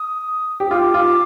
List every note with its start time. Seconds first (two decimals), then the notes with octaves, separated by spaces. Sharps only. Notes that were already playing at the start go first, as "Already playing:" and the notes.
Already playing: D#6
0.60 G4
0.71 F4 D6
0.94 F4